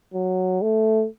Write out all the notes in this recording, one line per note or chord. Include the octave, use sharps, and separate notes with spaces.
F#3
A3